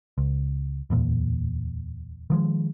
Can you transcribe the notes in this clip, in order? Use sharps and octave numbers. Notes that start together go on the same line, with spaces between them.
C#2
D1 E2 A#2
D#3 F3 G#3